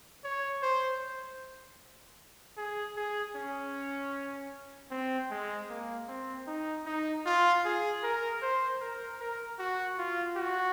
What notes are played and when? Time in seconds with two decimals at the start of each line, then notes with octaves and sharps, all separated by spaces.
0.24 C#5
0.62 C5
2.57 G#4
2.97 G#4
3.36 C#4
4.91 C4
5.31 G#3
5.69 A#3
6.08 C4
6.47 D#4
6.86 D#4
7.26 F4
7.65 G#4
8.03 A#4
8.42 C5
8.81 A#4
9.20 A#4
9.59 F#4
9.99 F4
10.37 F#4